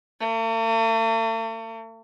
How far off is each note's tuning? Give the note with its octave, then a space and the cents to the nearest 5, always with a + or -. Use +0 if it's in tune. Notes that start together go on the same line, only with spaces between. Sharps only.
A3 +45